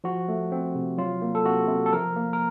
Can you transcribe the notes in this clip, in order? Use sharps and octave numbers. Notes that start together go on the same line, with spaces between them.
F3 F#4
A3
C4
C3
F#3 F4
A#3
A4
C3 F#4
C3
A4
F3 A#4
A#3
A#4